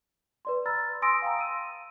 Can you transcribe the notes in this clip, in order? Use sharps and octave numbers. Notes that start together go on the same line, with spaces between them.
B4 D5 C6
A#5 B5 E6 F6 A6
G#5 C6 D#6 E6 A#6 D7
F5 G5 A5 A#5
E6 D#7